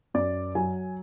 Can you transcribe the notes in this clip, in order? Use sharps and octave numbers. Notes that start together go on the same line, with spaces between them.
F#2 D5
F#3 G#5